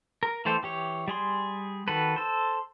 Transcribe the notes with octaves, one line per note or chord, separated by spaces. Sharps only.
A#4
E3 A3 A4 C5 G5
E3 G4 C#5
G3 G#4 C6
D#3 F#4 A4 B4
A4 C5